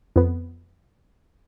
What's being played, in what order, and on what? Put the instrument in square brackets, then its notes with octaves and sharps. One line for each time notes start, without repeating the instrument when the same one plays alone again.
[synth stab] F2 B3